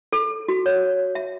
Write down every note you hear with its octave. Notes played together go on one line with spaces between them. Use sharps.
A4
F#4
C#5
E5